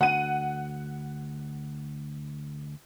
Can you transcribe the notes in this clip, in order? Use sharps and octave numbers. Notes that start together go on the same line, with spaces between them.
D2 F#5 D#7